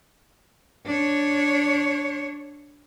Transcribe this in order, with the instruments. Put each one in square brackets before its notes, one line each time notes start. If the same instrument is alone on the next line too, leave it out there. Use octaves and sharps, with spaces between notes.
[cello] D4 C#5